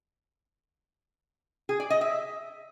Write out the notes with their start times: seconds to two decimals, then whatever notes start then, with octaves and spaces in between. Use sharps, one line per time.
1.69 G#4
1.80 D5
1.90 D#5
2.01 E5